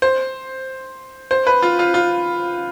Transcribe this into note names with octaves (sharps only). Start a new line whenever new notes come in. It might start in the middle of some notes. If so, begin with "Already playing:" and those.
C5
C5
B4
F4
F4
F4